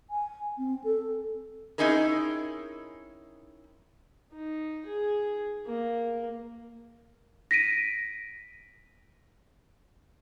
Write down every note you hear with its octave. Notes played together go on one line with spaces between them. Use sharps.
G#5
C4
A4
C4 C#4 D#4 E4 G#4 A#4
D#4
G#4
A#3
A#6 B6 D7 D#7